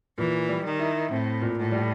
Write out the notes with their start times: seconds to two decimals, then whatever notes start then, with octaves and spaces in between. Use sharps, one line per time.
0.18 A#2 E3
0.49 G3
0.64 D#3
0.79 E4
1.10 A2 C4
1.42 A#2
1.56 A2
1.72 G3